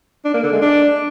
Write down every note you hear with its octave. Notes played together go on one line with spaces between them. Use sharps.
D4
A#3
D3
G#3
D4